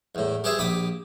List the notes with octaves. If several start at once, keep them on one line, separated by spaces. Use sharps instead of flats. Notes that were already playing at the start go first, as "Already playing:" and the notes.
E2 A2
G4 G#4 B4 C5 E5
A#1 G4 B5 D6 D#6